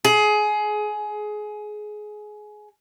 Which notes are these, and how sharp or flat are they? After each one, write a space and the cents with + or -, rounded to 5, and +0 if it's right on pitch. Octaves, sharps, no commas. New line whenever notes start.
G#4 +20